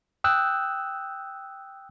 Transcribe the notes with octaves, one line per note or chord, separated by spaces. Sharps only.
G5 D#6 E6 F#6 G6